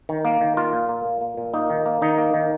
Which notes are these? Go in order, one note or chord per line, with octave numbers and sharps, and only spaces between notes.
D#3
A#3
D#3
A#3 F4
A#2
A#3
A#2
A#3
A#2
A#3 D#4
D#3
A#3
D#3 D#4
A#3
D#3